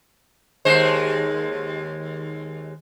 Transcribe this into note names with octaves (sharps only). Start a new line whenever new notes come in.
D#2 G#3 C5